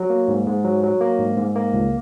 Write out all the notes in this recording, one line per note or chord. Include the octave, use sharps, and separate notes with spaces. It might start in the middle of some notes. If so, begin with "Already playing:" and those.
Already playing: F#3
A#3
G#2
G#2
F#3
F#3
A#3
G#2
G#2
A#3
C#2